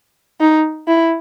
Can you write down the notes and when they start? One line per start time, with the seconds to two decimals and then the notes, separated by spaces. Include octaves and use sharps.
0.40 D#4
0.87 E4